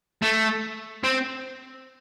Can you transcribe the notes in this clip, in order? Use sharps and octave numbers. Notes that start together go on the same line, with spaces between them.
A3
C4